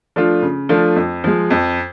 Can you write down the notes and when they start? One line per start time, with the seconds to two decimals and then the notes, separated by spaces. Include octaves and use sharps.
0.16 F3 A3 D4 F4
0.42 C#3
0.69 F3 A3 D4 F4
0.96 F2
1.24 F3 G#3
1.50 F2